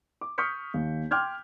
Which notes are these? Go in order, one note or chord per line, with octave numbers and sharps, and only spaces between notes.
D6
C#6 D#6 F6 G6 B6 C#7
D#2
G5 C6 D6 F6 G6 G#6